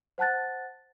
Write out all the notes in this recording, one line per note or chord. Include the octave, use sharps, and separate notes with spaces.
C5 F#5 A5 F#6 A6